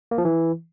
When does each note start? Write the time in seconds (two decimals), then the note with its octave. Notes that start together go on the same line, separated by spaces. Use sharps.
0.11 A#3
0.18 F3
0.25 E3